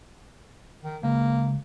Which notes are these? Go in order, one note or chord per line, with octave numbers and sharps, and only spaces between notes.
D#3
C#2 A#3